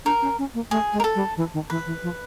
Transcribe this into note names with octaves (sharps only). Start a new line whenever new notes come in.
D4 A#4
C#4
C#4
A#3
A3 G#4
G#3
A#4
A4
G3
E3
D#3
E3 B4
E3
F3